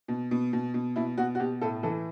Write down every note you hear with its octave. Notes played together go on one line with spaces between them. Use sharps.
B2
B2
B2
B2
B2 E4
B2 F#4
F#4
B2 G4
A2 A4
E3 A4